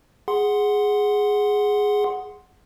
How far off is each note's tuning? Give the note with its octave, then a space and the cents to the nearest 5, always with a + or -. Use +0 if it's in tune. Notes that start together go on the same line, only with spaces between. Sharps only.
G#4 +0 F#5 +0 C6 +0